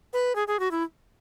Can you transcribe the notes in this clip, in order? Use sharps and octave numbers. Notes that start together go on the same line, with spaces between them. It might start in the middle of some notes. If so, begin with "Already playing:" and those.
B4
G#4
G#4
F#4
E4